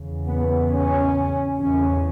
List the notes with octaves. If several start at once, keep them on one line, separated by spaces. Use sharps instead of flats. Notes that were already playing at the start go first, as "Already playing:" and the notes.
Already playing: E2 C#3
B3
C#4
E2 C#3 C#4